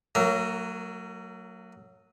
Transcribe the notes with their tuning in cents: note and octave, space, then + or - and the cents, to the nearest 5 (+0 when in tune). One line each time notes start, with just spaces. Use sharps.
F#3 +0 A3 +45 A#4 +0